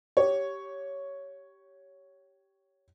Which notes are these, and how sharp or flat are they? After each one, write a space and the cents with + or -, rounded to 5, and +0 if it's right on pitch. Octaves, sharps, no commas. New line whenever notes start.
G4 -10 C#5 +5